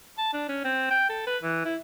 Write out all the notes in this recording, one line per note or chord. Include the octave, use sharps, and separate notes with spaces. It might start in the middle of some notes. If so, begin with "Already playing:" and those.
A5
D4
C#4
C4
G5
A4
B4
E3
E4